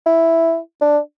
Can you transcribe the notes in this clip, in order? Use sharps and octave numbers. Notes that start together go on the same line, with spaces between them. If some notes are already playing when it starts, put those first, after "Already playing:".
E4
D4